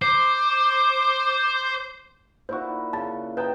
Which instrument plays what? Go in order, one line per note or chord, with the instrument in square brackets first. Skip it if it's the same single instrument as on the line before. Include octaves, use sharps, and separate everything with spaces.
[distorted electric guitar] C5 [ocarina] D6
[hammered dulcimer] A#2 E4 F#4 [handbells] C5 C#6
[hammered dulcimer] C#3 [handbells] A5 A6
[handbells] B4 A#5 [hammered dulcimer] D#5 G5 A5